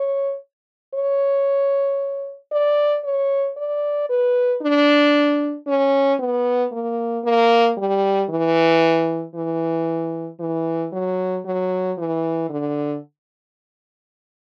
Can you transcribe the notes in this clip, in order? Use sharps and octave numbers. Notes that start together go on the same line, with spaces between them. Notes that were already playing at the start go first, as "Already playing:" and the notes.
Already playing: C#5
C#5
D5
C#5
D5
B4
D4
C#4
B3
A#3
A#3
G3
E3
E3
E3
F#3
F#3
E3
D3